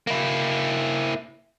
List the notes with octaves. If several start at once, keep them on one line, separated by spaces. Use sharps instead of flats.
A#3 E4